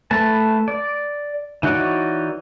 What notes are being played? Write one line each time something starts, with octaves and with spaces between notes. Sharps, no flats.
A3 B4 A5
D5
E3 D#4 F#4 C#5 D5